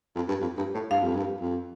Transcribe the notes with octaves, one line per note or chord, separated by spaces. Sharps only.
F2
G2
F2
G2
A2
G2 F5
F2
G2
F2